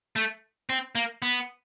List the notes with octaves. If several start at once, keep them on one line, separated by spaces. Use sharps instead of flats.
A3
C4
A#3
B3